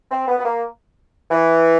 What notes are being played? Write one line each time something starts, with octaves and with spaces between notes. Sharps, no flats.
C4
B3
B3
A#3
E3